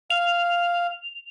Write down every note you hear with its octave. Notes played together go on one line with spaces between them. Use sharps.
F5 F7